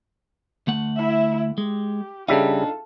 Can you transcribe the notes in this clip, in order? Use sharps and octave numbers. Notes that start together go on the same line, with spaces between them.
D2 A3 F#5
E4 E5
G#3 G4
C#3 G3 D4 D#4 F4 A4 E5